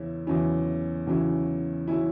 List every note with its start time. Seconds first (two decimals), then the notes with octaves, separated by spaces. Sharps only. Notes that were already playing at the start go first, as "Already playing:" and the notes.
Already playing: E2 C#3 C#4 E4
0.27 E2 C#3 F#3 C#4 E4
1.07 E2 C#3 F#3 C#4 E4
1.88 C#3 F#3 C#4 E4